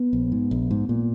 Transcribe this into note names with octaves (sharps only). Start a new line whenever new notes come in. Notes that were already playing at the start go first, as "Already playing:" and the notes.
Already playing: B3
A#1
G#2
A#1
G#2
A#2